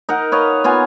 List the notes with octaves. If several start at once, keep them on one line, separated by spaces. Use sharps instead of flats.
D#4 A#4 F#5
B4 C#5 D#5 F5
B3 F4 G#5 A#5